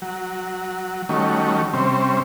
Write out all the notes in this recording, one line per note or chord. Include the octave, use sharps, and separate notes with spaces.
F#3
D#3 F#3 G3 A3 C#4
C3 G3 C4 C#4